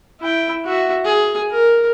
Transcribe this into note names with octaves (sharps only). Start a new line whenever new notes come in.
E4 G5
F#4 E5
G#4
A#4